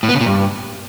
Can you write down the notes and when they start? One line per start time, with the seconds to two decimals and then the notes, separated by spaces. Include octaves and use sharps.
0.03 A2
0.09 B3
0.15 C#3
0.21 A#2
0.26 G2